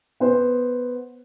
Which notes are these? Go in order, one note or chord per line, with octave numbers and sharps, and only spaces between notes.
B3 C5